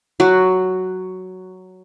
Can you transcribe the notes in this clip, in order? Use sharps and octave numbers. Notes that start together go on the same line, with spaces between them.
F#3 F#4